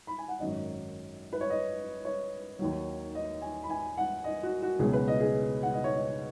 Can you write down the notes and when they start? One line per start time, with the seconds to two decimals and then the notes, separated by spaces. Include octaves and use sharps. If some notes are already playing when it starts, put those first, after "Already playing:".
0.07 B5
0.18 G#5
0.28 F#5
0.39 G#1 F#2 D#3 F#3 D#5
1.33 B4
1.41 C#5
1.50 D#5
2.05 C#5
2.59 D#2 D#3 F#3
3.15 D#5
3.42 G#5
3.63 B5
3.70 G#5
3.98 F#5
4.24 D#5
4.43 F#4
4.62 F#4
4.79 C#2 B2 F#3 G#4
4.93 B4
5.08 D#5
5.20 G#4
5.63 F#5
5.73 D#5
5.84 C#5
5.96 D#5